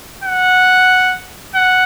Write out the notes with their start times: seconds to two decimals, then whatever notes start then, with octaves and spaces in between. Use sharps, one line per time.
0.24 F#5
1.55 F#5